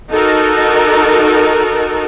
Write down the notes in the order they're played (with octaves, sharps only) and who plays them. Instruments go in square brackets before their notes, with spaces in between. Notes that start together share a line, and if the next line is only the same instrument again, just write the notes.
[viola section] D#4 F#4 A4 A#4